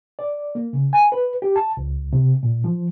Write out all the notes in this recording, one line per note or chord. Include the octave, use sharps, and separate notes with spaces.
D5
A#3
C#3
G#5
B4
G4
A5
C#2
C3
A#2
F3